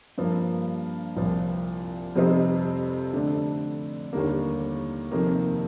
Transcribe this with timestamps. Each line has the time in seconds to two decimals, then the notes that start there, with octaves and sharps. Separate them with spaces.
0.18 G2 F3 A#3
1.16 C2 A#2 F3
2.16 F2 C3 G3 C4 D#4
3.13 D3 A3 D4
4.13 D#2 D3 G3 A#3
5.12 F2 C3 D#3 A#3